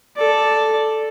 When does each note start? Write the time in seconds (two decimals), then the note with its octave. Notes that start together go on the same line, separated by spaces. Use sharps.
0.17 A4 D5